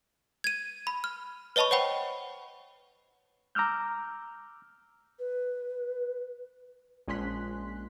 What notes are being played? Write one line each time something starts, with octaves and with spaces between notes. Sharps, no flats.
G#6 D#7
B5
F6
B4 C#5 D#5 A5 B5 C#6
C5 C#5 F#5 G5 B5
A#5 D6 E6 F6 G6
B4
A#1 G#3 C#4 C6 F#6 B6